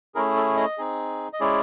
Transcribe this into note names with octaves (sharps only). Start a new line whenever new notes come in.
A3 C#4 E4 G#4 A#4
A4
D#5
C4 D#4 G#4
D#5
G#3 C#4 E4 G#4 D5